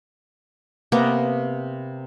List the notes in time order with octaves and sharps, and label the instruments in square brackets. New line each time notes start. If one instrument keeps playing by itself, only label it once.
[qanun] C3 A#3 B3 A#5